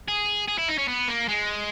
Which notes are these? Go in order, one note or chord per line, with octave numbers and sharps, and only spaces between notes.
G#4
G#4
E4
D#4
C#4
B3
A#3
G#3